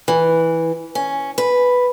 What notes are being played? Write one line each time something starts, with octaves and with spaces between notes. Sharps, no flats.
E3
C#4
B4